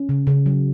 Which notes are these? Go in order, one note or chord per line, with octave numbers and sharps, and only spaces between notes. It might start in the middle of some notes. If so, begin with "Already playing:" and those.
Already playing: C#4
C#3
C#3
F#3